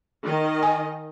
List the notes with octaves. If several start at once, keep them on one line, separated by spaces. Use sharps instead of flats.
D#3 D#5
G#5